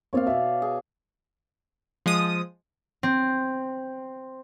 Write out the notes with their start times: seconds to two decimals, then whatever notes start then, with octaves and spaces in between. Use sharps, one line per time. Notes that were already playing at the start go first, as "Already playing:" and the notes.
0.13 A#3 C4 C#5 D5 F5
0.27 B2 E5
0.62 G#4
2.06 F3 G#3 D#6
3.03 C4